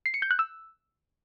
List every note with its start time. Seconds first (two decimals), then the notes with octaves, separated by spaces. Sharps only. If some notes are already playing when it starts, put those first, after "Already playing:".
0.06 C7
0.14 C#7
0.22 G6
0.31 F#6
0.39 E6